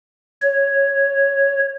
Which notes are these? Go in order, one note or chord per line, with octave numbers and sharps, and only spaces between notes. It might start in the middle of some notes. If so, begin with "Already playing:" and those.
C#5